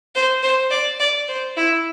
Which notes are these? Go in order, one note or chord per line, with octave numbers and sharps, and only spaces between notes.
C5
C5
D5
D5
C5
E4